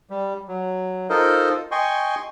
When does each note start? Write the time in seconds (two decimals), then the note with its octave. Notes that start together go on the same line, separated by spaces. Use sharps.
0.10 G3
0.48 F#3
1.10 D#4 F4 A4 A#4 C5 D#5
1.71 D#5 G5 G#5 C6 C#6